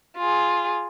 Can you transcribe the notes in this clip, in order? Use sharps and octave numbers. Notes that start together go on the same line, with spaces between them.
F4 G#4